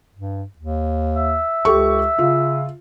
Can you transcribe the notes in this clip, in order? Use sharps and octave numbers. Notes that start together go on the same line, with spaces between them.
G2
D#2
E5
C#2 G4 A4 C#6
C#3 F4